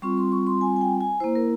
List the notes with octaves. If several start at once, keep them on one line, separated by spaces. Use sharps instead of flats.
G3 C4 F4 C#6
C6
C#6
C6
G#5
G#5
G5
G#5
A#3 E4 C5
A#4